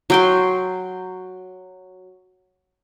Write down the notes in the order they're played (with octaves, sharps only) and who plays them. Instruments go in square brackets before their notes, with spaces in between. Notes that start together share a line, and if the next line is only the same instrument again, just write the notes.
[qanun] F#3 G5 C6